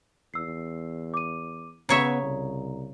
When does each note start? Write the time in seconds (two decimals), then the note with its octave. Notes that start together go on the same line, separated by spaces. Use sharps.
0.34 E2 E6 C7
1.14 D6 D#7
1.89 C#3 B3 C#5 E5 A#5
2.23 C2